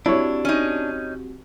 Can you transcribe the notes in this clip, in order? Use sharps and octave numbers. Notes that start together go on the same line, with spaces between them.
C4 D4 E4 F#4 G4 C#5
C#4 D#4